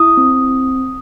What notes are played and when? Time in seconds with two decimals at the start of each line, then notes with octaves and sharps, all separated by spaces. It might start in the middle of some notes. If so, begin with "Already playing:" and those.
Already playing: E4 D#6
0.17 C4